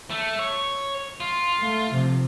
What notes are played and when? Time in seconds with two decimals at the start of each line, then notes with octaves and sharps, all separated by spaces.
0.10 A3
0.39 C#5
1.20 F4
1.59 A3
1.92 C3 F3